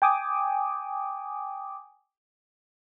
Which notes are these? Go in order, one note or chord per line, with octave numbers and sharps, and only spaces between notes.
G5 G#5 D6 D#6